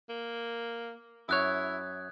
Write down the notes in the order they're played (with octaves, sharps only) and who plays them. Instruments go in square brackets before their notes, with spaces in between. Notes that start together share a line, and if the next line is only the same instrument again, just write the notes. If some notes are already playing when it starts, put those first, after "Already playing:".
[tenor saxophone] A#3
[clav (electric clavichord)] F#2 C#5 [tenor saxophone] E4 [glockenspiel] D#6 F#6 G#6